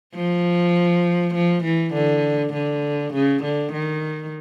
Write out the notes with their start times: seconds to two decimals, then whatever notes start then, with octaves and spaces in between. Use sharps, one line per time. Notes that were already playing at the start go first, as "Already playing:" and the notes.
0.15 F3
1.34 F3
1.64 E3
1.94 D3
2.53 D3
3.14 C#3
3.43 D3
3.73 D#3